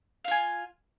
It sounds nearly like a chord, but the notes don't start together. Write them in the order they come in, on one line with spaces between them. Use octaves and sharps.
F5 F4 G#5